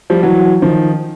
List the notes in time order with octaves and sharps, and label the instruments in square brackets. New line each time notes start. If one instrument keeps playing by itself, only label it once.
[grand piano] F3 G3
E3 F#3
D#3 F3